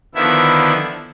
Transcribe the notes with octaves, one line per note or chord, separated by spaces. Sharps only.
D3 D#3 F3 B3 E4 E5